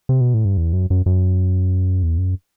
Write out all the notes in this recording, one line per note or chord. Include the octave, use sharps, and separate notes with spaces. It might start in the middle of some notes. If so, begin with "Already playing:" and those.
C3
B2
A2
G2
E2
F#2
F#2
F#2
E2
F#2